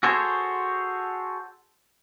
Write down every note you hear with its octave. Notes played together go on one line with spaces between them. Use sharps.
F#4 G#4 A4 C5 C#5